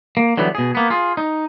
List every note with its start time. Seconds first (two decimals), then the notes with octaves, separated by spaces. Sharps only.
0.17 A#3
0.37 D3 E3 F#3 G3 B3
0.55 B2 G#4
0.75 A#3 B3
0.90 F4 G#4
1.17 D#4